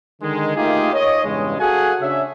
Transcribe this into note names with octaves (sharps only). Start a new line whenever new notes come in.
D3 D#3 G#3
A3 A#3 D#4 F4 G4 G#4
C#5 D#5
E2 G2 C#3 G#3
F#4 G#4 A4 F5 F#5 G#5
C#3 D4 C#5 E5